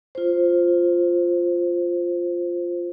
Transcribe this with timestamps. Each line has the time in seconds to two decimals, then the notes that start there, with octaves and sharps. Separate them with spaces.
0.15 F4 C5